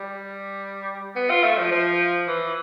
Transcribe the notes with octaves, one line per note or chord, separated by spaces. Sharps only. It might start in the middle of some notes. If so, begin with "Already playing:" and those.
Already playing: G3
B3
F4
A3
F3
F3
E3